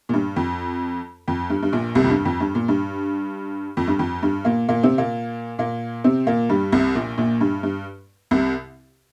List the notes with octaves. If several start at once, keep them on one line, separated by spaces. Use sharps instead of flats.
A#2
G2
F2
F2
G2
G2
A#1 A#2
C2 C3
F2
G2
F2
G2
A#2
G2
F2
G2
F2
G2
A#2 A#3
A#2 A#3
C3 C4
A#2 A#3
A#2 A#3
C3 C4
A#2 A#3
G2 G3
C2 C3
A#1 A#2
A#1 A#2
G2
G2
C2 C3